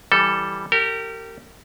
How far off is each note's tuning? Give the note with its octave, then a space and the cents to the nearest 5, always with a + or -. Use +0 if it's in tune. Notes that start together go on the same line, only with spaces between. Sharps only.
E3 +0 G3 +0 A4 +0
G4 -15 A#4 -35